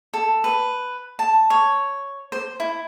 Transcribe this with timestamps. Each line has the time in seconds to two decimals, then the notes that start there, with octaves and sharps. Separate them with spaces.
0.14 A4
0.44 B4
1.19 A5
1.50 C#5
2.32 C5
2.60 E4